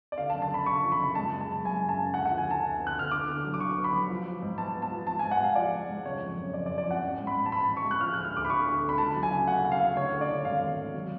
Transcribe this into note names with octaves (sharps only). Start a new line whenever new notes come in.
D5
D3 F5
A5
F#1
A5
F#1 B5
D3 C#6
F3
B5
F#1
G#3 A5
G#3
A5
F#1
F#2 G#5
C#3
A5
C#3
D2 F#5
F3 F#5
G#5
D2 A5
D2
B3
F#6
D3 F6
D3 D6
D3
F#3
D6
D3 C#6
B3
B5
F#3
F3
F3
G#2
B3 A5
B3
A5
F3
F3 A5
G#2 G#5
F#5
G#3 F5
F3 D5
G#3
G#2
F#1 C#5
F2
F#1
F2 D5
D5
F2
D5
F3 F#5
A1
G#2
B5
G#2
A5
G#2 B5
A1
C#6
G#3
F#6
F3 F6
D2 F#6
F6
D2 D6
B5
D3 C#6
D2
D3
B5
C#2 A5
F#3
G#5
C#3
A3 F#5
C#3
F5
A3
D3 C#5
D3
D5
D3
G#1 F5
G#1
G#1
F#3